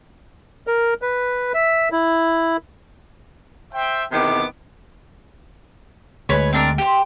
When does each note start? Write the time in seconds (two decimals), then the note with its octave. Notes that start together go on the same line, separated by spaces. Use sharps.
0.67 A#4
1.02 B4
1.54 E5
1.92 E4
3.73 C5 E5 G5
4.12 E2 C3 D#3 B3 D6
6.29 D2 G#3 B4 C#5
6.53 C4 D4 A#4
6.78 G4 C5